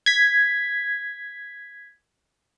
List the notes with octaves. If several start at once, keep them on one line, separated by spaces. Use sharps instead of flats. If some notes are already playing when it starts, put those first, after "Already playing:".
G#6 B6